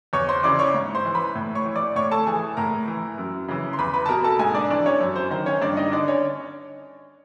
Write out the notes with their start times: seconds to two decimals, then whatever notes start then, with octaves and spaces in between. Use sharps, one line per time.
0.13 E2 C#5 C#6
0.28 C5 C6
0.43 C#3 E3 D5 D6
0.59 C#5 C#6
0.74 G#2
0.95 C5 C6
1.05 E3
1.15 B4 B5
1.35 A2
1.55 C#5 C#6
1.66 E3
1.75 D5 D6
1.95 A2 C#5 C#6
2.11 A4 A5
2.27 E3 G#4 G#5
2.57 A2 A#4 A#5
2.88 E3
3.18 F#2
3.48 C#3 E3
3.73 C6
3.78 E2 B4 B5
3.94 B4 B5
4.06 A5
4.09 B2 A#4 A#5
4.24 A4 A5
4.39 G#2 G#4 G#5
4.54 D4 D5
4.70 E3 D4 D5
4.86 C#4 C#5
5.00 F#2
5.15 C5
5.31 D#3 C5
5.46 C#4 C#5
5.62 G2 D4 D5
5.77 D#4 D#5
5.92 D3 D4 D5
6.08 C#4 C#5